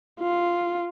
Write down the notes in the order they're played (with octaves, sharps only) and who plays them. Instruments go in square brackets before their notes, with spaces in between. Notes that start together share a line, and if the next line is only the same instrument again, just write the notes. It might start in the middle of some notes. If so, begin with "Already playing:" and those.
[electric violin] F4